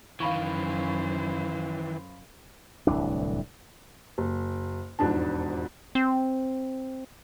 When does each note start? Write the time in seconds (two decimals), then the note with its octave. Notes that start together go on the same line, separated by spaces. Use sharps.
0.20 F#2 D#3 E3 C5 F5 B5 C#6
2.87 D1 C2 E3 D4
4.18 F#1
4.99 E1 F2 G#2 D4 A5
5.95 C4